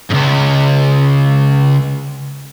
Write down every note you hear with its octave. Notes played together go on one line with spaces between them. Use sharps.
C#2 G#2